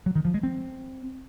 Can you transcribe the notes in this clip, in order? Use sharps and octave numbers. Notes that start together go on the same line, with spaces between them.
F#3
D#3
F3
G#3
C4